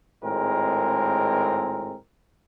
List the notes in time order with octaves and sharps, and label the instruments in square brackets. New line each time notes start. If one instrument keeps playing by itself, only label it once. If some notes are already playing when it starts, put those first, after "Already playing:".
[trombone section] G#1 A2 G#3 C4 A#4